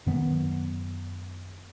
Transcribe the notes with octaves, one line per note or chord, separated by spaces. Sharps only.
F#2 D#3 F#3 B3